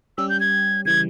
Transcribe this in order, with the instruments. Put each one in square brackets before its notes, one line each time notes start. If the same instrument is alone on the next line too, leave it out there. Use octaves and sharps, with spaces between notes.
[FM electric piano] G3 C#4 G4 [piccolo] E6
[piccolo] G6
G#6
[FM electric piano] C#3 E3 G3 [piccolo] G#6